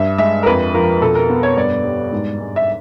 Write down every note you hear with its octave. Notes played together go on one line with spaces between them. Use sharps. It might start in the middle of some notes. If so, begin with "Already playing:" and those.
Already playing: G2 E5
G#3 E5
A#4
F2 B4
F3 A#4
B2 A4
A#4
B3
C#5
G2 D5
G3
G#2
G#3
E5